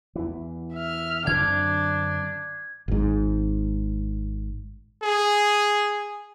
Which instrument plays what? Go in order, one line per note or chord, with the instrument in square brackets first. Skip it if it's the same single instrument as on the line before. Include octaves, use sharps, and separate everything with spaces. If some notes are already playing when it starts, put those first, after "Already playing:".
[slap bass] E2 E3
[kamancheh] E5 F6
[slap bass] F#2 D3 C4 [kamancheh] D4 [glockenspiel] G#6
[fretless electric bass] G#1 G#2
[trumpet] G#4